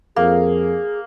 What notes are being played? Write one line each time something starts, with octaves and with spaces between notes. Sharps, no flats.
F2 A#3 G#4